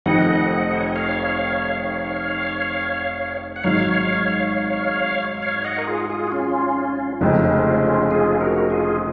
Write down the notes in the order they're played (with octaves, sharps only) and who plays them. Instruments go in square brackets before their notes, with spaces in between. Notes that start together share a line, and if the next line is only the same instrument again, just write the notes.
[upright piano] F1 F2 D#3 [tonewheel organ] D#5 F#5
[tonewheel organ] C5
C#5
D#5
C#5 F5
F#5
[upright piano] G#1 G#2 F#3 [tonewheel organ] C#5 F5
[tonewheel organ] C#5 F5
D#5 F#5
A#4
F4 G#4
F4 G#4
F#4
C#4 F4
[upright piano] F1 F2 C#3 G#3 [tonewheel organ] F4
[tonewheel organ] D#4
C#4 F4
F4 G#4
F#4 A#4
F4 G#4